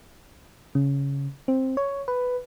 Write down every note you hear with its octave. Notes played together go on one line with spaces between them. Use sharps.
C#3
C4
C#5
B4